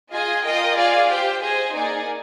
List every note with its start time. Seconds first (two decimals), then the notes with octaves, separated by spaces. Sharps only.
0.10 F4 G#4 D#5 G#5
0.42 F4 A#4 D#5 G5
0.75 F4 G#4 D5 F5 G#5
1.08 G4 C5 G5
1.40 G#4 C5 D#5 G#5
1.73 A#3 D#4 G#4 D5 G#5